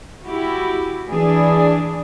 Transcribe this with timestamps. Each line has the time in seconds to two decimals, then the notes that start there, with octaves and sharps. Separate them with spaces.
0.24 E4 F#4 G4
1.08 E3 D4 G#4